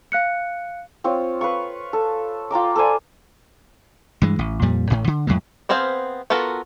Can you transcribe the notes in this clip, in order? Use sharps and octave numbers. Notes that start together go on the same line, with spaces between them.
F5 F#6 C#7
C4 F4 C#5
B4 F5 C#6
A4
F4 G5 A#5 D6
A4 C5 D5 G#5
G2 E3 G#3
A1
F2 A#2 G3
A1 A2
D3
F2 A2 F#3 G#3
B3 C4 G#4 C5 F5
B3 F4 F#4 A4 A#4